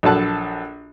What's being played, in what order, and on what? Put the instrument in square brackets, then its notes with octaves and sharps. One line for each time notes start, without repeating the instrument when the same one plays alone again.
[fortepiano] A#1 F#3 A4 A5 F#6